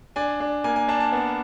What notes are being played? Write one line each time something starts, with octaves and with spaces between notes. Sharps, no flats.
D4 G#5
D4
A#3 G#5
G#5
D4 A5
A5
B3